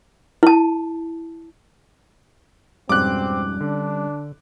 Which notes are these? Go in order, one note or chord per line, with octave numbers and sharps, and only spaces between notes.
E4 A5
F2 G#2 B2 G3 C4 C#4 D6 F#6
D3 D4